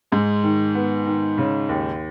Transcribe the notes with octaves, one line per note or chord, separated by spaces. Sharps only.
G#2 G#3
D#3
B3
D#3
C#3
D#2